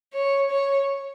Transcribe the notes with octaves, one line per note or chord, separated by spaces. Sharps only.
C#5
C#5